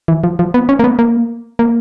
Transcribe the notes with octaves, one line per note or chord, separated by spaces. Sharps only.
E3
F3
F3
B3
C#4
A#3
B3
A#3
A#3